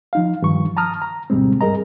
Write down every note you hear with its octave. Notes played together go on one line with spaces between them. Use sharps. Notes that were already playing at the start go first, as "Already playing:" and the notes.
F3 D#4 F5
G2 D#3 F3 C#6
A5 A#5 D#6 F6
A#5
D2 G#2 B2 G3 G#3 C4
G2 G3 G#4 A#4 D#5 A#5